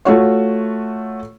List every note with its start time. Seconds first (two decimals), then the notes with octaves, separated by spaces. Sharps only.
0.05 A3 F4 F#4 C#5